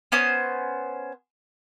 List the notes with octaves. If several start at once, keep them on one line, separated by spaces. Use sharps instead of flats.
B3 C#4 C5 D#6